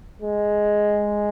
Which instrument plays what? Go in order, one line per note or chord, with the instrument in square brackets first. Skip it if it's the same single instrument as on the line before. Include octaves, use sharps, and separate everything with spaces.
[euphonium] G#3